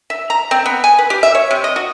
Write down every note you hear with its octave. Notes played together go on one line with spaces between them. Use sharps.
E5
A#5
C4
B3
G#5
B4
G4
E5
C#5
C3
D#5
F#4